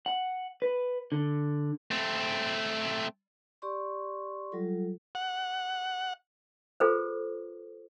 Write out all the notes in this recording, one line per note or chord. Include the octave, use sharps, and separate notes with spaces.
F#5
B4
D3
A3 C4
G4 D5 C6 C#6
F#3 G3 F4 A4
F#5
F4 G#4 A4 B4 C5